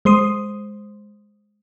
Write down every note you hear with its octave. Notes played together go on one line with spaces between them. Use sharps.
G#3 C5 C6 D#6